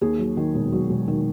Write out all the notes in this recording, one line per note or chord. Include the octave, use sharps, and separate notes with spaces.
D#2 G#4
F#3
D#3
E1
F#3
E1
D#3